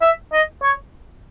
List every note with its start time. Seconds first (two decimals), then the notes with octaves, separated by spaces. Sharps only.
0.01 E5
0.32 D#5
0.62 C#5